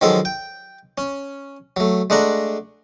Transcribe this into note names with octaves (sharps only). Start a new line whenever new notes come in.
D#3 F3 F#3 G#3 A4
G5
C#4
F#3 A3
G#3 A3 D4 F#5 A#5